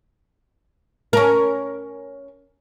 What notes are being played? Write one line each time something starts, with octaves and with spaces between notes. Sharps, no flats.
C#4 A#4